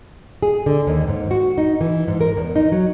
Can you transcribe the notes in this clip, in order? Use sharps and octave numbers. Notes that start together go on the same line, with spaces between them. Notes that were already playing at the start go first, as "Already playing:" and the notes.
G#4
D3
D#2
G#2
F#4
D#4
E3
G#2
A#4
E2
D#4
F#3